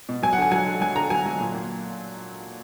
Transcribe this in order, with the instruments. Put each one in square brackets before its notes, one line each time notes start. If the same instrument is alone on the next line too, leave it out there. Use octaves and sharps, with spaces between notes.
[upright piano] B2
F#3 G#5
F#5
D3 G#5
F#3 G#5
D3
F#3 G#5
D3 A#5
F#3 G#5
F#3
A#2
A#2